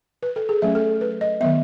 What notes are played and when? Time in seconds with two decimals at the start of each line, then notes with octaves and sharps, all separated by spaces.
0.23 B4
0.36 A4
0.49 G#4
0.62 F#3 A3 C#4 E5
0.75 A4
1.01 B4
1.21 D#5
1.41 D#3 F#3 B3 E5